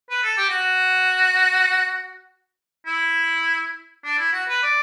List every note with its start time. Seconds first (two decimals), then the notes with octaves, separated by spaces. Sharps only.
0.10 B4
0.23 A4
0.37 G4
0.50 F#4
2.86 E4
4.05 D4
4.18 E4
4.33 F#4
4.49 B4
4.63 D5